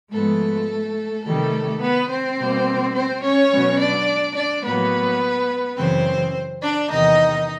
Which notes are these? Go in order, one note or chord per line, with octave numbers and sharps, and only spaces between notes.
G#2 F3 G#3 A3 B3 A4
C3 D#3 G3 A3 A4
B3 B4
C4 C5
B2 G3 A#3
C4 C5
C#4 C#5
B2 F#3 B3
D4 D5
D4 D5
A2 F#3 A#3 B3 B4
F#2 C#3 E3 C4 C5
D4 D5
E2 C3 D#3 D#4 D#5